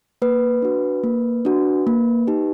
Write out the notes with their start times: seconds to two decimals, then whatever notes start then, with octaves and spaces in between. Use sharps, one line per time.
0.22 A#3 B4
0.62 D4 F#4
1.04 A#3
1.45 D4 F#4
1.87 A#3
2.27 D#4 G4